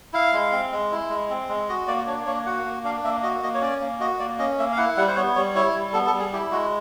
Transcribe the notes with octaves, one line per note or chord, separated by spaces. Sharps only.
E4 F5
G#3
C4
G#3
E4
G#3
C4
G#3
F#4 D#5
A#3 D5
D4 C#5
A#3 C#5
F#4 F#5
A#3
D4 F5
A#3 E5
F#4 D#5
A#3 D#5
C#5
C#4 D5
A#3
F#4 D#5
A#3 D5
C#4 D#5
A#3 E5
F5
E4 F#5
G3 F#5
C5
B3 C#5
G3 C#5
E4 C#5
G3
B3 A4
A4
G3
G#4
E4 G4
G#3 F#4